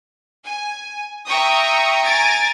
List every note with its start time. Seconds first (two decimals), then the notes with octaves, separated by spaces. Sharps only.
0.44 G#5
1.28 E5 G5 A#5 C#6 D#6
2.05 G#5 A#5 A6 D7